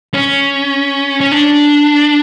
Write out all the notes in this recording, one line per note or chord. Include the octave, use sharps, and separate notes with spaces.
C#4
C#4
D4